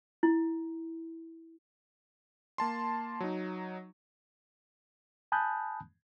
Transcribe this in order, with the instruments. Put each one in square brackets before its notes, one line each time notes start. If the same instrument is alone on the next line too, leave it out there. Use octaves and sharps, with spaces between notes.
[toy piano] E4
[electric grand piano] A#3 A5 C6
F#3 D#4
[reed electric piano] G#5 A5 B5 D#6 F#6 G6